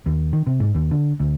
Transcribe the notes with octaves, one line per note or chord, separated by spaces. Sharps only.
D#2
D#3
C3
G#2
D#2
D3
D2